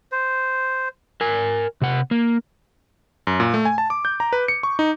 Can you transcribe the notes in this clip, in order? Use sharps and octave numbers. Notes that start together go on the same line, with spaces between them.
C5
A#4 G#5
C3 F#5
A#3
F#2
A#2
A3
G#5
A5
D6
G6
A#5
B4
C#7
C#6
D#4